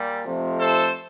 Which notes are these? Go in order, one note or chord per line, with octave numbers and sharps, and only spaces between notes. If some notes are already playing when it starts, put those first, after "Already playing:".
Already playing: A#2 G3
F2 C3 F3 A3
A4 C5